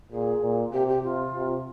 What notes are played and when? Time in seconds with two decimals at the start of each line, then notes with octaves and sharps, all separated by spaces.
0.12 A#2 G#4
0.42 A#2
0.73 C3 G4
0.89 G4
1.03 C3 F4
1.34 C3